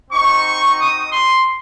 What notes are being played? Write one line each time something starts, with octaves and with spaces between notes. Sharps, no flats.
C4 D#4 F#4 C#6
D#6
C6